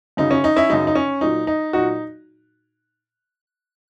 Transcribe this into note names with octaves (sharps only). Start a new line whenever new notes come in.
F#2 C#3 F#3 D#4
C#4
D#4
C#4 E4
F#2 C#3 F#3 D#4
D#4
C#4
A#2 F#3 D#4
D#4
A#2 F#3 D#4 F#4